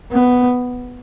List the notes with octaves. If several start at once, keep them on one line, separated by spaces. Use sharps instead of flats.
B3